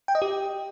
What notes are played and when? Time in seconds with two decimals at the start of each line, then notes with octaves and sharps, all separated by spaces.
0.08 G5
0.15 D#5
0.22 G4